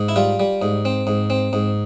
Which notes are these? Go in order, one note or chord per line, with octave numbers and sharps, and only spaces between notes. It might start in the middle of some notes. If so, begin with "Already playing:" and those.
Already playing: G#2
E4
G3 F4
G3
G#2
C4
G#2
C4
G#2